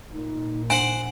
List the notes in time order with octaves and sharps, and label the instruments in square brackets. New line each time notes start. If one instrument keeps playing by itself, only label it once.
[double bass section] A#2 [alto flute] D#4
[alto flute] D4 [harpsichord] C5 F#5 [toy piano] G#5